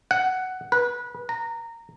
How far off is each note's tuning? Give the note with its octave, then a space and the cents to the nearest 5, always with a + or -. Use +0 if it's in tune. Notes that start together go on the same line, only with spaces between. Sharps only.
F#5 +10
B4 -25
A#5 -15